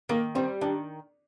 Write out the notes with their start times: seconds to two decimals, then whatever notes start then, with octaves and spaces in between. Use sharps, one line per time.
0.09 D#3 A#3
0.35 G3 C4
0.61 D#3 D4